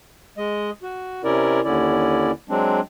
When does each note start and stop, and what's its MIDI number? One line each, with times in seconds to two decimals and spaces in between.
0.38 0.70 56
0.38 0.70 75
0.83 1.22 66
1.24 1.61 48
1.24 1.61 61
1.24 1.61 64
1.24 1.61 70
1.24 1.61 74
1.64 2.31 39
1.64 2.31 50
1.64 2.31 61
1.64 2.31 64
1.64 2.31 74
2.49 2.80 54
2.49 2.80 56
2.49 2.80 60
2.49 2.80 62